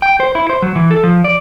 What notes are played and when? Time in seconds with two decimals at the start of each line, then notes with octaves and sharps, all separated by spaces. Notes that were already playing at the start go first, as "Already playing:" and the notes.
0.02 G5
0.20 C5
0.35 E4
0.49 C5
0.62 F#3
0.75 E3
0.91 A4
1.04 F3
1.24 D5